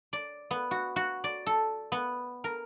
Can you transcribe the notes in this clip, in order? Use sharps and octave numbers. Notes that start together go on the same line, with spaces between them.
D5
B3
F#4
F#4
D5
A4
B3
A#4